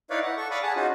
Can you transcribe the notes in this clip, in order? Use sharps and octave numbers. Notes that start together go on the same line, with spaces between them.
D#4 E4 B4 C#5 D5 F5
F#5
A4 C#6
D5 F5 B5 C#6 D#6
G#4 F#5 G#5 A5
C#4 D#4 F4 F#4